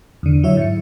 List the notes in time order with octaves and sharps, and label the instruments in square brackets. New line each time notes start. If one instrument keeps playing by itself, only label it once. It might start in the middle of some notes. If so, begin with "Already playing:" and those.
[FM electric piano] E2 D3
F#3 E4 C#5 E5
G#2 C#7